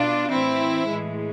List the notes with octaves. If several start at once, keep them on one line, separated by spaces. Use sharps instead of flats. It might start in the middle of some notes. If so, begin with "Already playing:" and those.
Already playing: B2 D4 F4
A2 E3 C4 E4
A2 E3 G#3